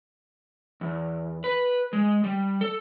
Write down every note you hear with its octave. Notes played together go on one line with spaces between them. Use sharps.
E2
B4
G#3
G3
A4